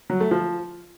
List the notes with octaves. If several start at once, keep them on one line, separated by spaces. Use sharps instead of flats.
F#3
A3
F3